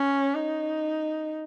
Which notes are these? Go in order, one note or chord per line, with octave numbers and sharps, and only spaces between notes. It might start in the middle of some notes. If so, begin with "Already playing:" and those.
Already playing: C#4
D#4